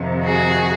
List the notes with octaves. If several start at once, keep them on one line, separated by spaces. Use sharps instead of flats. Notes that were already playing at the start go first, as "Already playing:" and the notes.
Already playing: F2 C3 D#3
F#4 G#4